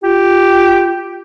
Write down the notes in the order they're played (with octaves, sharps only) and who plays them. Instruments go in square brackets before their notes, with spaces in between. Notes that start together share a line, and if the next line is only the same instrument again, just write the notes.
[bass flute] F4 [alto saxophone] G4